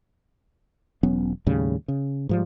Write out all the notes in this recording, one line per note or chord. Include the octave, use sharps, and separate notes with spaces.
E1 F#3 B3 C#4
D#2 A2 C#3 G3
C#3
G#2 F3 G3